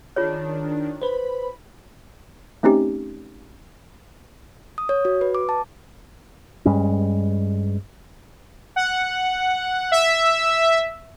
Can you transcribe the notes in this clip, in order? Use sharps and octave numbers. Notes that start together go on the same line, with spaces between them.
D#3 D4 F4 G#4 C#5
B4 C5 B5
A3 C4 C#4 D#4 G4
D#6
C#5
F#4
B4
D6
A5
G2 G3 G#3 C#4
F#5
E5